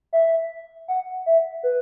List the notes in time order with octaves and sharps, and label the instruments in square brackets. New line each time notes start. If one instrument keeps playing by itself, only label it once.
[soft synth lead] E5
F#5
E5
B4